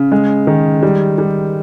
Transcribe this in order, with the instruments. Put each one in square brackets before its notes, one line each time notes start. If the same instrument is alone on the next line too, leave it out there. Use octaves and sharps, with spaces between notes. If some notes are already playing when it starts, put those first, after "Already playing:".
Already playing: [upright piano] C#3
G#3
D#3
G3
G3